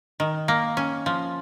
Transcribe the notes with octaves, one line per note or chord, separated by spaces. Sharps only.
D#3
A#3
C#4
F3